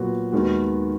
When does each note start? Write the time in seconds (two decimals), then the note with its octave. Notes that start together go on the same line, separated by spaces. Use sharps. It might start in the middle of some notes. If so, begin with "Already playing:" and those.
Already playing: A#2 F#3 B3 F#4
0.32 D#2 D#3 G#3 B3 F#4